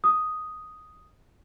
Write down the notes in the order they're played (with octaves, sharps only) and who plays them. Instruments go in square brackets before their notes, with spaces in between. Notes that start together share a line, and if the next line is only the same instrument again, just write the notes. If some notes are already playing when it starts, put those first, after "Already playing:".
[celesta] D#6